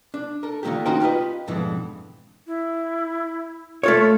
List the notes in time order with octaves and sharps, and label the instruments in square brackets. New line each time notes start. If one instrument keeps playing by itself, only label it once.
[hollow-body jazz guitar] D4
A4 A#4
D3 D#3 A#3 C4 F4 G4
C#4 D#4 F#4 A#4 C5 G5
F4 G4 A#4 B4 D#5
F2 G#2 B2 D3 E3
[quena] E4
[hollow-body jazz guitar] A3 A4 C#5 [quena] F4